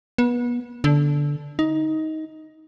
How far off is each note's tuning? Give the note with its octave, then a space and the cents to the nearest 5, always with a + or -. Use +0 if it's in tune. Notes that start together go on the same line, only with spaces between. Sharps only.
B3 -30
D3 -10
D#4 +15